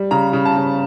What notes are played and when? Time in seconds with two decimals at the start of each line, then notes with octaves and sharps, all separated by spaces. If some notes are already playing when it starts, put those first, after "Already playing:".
Already playing: G3
0.11 C#3 A#5
0.33 C#3
0.45 A5
0.56 C#3